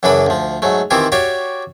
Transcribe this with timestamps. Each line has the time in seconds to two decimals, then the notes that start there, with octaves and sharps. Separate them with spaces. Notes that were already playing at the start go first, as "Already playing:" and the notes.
0.03 F#2 C#3 E3 D4 B4 B5
0.27 D2 F3
0.62 G#2 F#3 A3
0.91 D#3 E3 C4 E4 F4 G4
1.12 F#4 G4 C#5 D5 E5 F5